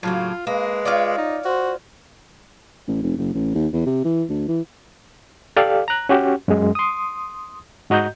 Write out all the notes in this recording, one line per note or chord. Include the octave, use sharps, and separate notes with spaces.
A2 C#3 F#3 A#3 F4
G#3 A#3 B4
F4 C#5 D5
D#4
F#4 C5
A1
F1
F#1
A1
D#2
E2
C3
E3
D2
E3
G4 A4 D5 F5
A#5 F#6
C#4 F#4 G4
F#2 G#3
C6 D#6
G#2 F#4 D#5 A#5 G6